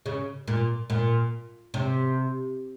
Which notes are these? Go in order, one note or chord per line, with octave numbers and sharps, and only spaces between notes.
C#3
A#2
A#2
C3